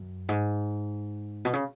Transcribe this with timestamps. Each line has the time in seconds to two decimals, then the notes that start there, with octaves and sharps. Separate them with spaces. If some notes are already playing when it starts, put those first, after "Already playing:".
Already playing: F#2
0.29 G#2
1.45 B2
1.53 C#3